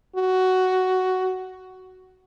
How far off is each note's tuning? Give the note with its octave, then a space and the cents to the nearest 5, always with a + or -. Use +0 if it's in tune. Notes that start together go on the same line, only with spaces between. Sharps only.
F#4 +10